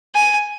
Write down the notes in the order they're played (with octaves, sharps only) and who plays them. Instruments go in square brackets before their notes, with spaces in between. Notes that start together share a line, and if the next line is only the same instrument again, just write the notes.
[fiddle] G#5